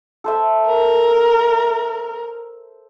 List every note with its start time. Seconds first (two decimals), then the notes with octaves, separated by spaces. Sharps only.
0.24 A4 C5 E5
0.67 A#4